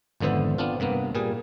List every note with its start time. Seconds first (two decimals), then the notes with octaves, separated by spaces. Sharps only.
0.20 G#1 F2 D3 B3 C5 E5
0.58 B3 C4 D4 F4
0.80 G2 C3 A#3 B3
1.15 A#2 G3 G#4